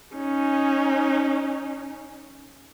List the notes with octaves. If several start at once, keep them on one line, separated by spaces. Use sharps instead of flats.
C#4 D#4